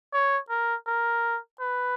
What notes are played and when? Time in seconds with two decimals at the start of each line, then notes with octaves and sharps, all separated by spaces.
0.13 C#5
0.49 A#4
0.87 A#4
1.60 B4